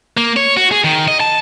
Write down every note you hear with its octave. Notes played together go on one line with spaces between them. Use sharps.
A#3
C#5
F#4
G#4
D#3
D#5
A5